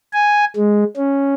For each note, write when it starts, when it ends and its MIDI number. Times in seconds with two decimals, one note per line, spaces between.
0.13 0.45 80
0.56 0.84 56
0.97 1.34 61